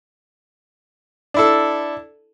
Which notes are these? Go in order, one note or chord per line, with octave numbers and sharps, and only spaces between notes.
D4 E4 A4